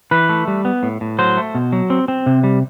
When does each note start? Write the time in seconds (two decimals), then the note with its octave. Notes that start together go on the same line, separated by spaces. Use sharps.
0.11 E3 B4
0.29 A3
0.48 G3
0.65 B3
0.83 A2
1.01 A2
1.19 F#3 C5
1.37 A3
1.55 B2
1.73 F#3
1.90 C4
2.08 C4
2.26 C3
2.44 G3